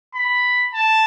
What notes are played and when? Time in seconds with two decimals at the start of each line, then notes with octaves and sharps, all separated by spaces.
0.15 B5
0.74 A5